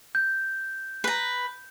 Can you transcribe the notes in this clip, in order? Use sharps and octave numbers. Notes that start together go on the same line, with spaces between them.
G6
B4 A#5